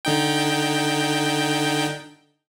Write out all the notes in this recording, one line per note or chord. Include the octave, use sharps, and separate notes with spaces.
D3 D#4 G5